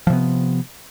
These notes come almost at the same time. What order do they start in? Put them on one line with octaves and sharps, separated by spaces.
F3 C3 B3